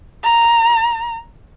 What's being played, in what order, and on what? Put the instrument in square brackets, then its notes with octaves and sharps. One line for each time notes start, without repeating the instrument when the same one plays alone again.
[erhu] A#5